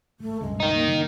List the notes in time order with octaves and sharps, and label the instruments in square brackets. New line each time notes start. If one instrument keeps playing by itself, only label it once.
[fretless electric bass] D#1 G#1 [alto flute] A3
[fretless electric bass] C#2 G2 B2 [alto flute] G#3
[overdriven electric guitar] D#3 D#4
[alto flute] A#3
[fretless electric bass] F#2 C#3 F#3